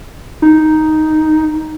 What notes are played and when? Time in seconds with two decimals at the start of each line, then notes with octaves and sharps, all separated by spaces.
0.42 D#4